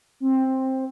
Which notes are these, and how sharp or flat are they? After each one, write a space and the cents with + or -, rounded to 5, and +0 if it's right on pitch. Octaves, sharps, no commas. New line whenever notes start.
C4 +10